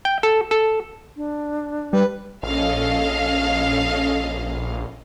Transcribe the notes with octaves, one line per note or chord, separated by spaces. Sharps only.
G5
A4
A4
D4
G3 B4
A#1 C#4 A4 D#5 F5